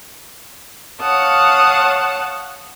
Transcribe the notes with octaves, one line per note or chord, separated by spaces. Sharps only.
C#5 F5 F#5 A5 D#6